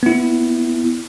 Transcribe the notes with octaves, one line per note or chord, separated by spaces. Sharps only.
B3 E4